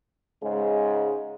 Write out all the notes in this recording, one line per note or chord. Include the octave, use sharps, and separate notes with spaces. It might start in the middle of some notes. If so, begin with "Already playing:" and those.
G#2 C#3 G#3